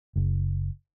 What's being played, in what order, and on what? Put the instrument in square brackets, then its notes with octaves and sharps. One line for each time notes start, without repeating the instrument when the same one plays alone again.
[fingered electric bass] F#1